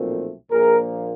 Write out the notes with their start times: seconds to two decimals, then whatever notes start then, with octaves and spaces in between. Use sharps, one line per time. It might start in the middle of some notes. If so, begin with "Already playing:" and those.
Already playing: B1 A#2 F3 A3 C4
0.51 A#1 A#2 F3 A#3 G#4 A#4